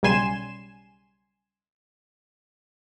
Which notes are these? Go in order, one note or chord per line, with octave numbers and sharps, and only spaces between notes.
B1 C#3 G3 G#5 C6 E7